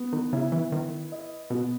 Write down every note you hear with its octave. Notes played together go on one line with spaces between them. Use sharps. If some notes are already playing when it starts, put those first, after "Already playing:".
Already playing: B3
D#3
C#3 E4
E3
D#3 B4
D#5
B2 B3